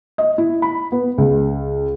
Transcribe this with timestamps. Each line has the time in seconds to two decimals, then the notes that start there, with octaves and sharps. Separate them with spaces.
0.18 D#5
0.38 E4
0.62 B5
0.92 B3
1.18 C#2